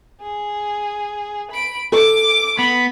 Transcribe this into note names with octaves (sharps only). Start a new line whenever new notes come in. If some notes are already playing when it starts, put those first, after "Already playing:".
G#4
B5 D7
A4 D6 D7
B3 B5